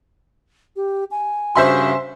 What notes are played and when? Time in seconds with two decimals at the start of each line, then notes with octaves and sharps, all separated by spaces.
0.76 G4
1.11 G#5
1.55 G2 C#3 F#4 C5 E5 C6